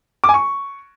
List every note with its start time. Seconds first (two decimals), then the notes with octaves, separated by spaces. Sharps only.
0.24 D6
0.29 G#5
0.34 C#6